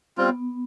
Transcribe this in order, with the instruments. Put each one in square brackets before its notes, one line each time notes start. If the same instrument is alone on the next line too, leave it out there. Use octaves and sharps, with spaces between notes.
[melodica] G3 C4 F4 [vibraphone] B3